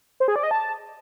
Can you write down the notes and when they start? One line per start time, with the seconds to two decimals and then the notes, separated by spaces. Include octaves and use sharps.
0.20 C5
0.28 G#4
0.36 D5
0.43 D#5
0.51 A5